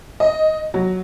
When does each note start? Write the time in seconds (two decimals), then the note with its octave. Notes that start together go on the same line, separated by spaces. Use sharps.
0.20 D#5
0.74 F#3